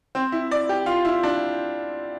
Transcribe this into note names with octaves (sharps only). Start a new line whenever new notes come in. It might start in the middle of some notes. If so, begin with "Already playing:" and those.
C4
E4
D5
G4
F4
E4
D4